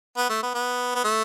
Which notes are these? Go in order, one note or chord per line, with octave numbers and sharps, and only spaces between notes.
B3
A3
B3
B3
B3
A3